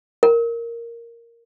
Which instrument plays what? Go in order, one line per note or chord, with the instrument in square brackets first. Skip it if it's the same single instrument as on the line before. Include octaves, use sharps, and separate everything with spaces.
[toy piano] A#4